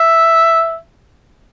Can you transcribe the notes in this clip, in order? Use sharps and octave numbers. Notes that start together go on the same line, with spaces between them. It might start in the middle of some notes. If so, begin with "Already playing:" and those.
Already playing: E5